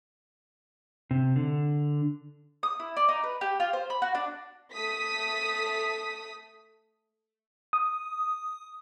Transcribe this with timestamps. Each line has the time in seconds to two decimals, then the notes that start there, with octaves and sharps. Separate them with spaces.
1.11 C3
1.36 D3
2.63 D#6
2.80 E4
2.97 D5
3.09 D#4
3.24 B4
3.41 G4
3.60 F4
3.73 C5
3.90 B5
4.02 F#4
4.15 D4
4.73 A3 D#6 B6
7.73 D#6